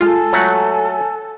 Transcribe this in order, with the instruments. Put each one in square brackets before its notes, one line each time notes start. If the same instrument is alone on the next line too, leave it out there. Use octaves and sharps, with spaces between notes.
[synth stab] G#3 F4 [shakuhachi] A4 [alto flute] G#5
[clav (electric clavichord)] F#3 A3 F#5